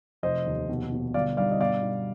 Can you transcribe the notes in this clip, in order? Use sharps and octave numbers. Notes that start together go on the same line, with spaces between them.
F1 C5 D#5
D#2
B2
B2
G1 D5 F5
G2 D5 F5
D#5
B2 D5 F5
B2